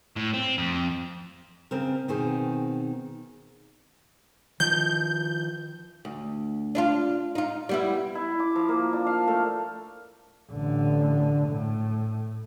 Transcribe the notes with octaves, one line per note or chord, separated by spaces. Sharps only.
A2
C4
F2
C#3 C4 A#4
B2 D#3 C4 G#4
D#3 F3 G6
D2
D4 D#4 F4
D#4 F4
G3 B3 E4
E4
D6
F3
A#3
D4
F5
A3
A1 D3
A2